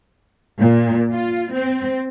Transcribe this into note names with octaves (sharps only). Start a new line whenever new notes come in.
A#2
F4
C4